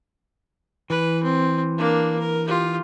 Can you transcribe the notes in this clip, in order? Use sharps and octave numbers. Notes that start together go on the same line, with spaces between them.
E3 B4
C4
A#3 D4
A#4
F4 G4